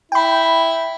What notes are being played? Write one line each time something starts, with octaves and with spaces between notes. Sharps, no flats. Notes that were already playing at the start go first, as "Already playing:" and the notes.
E4 G5 B5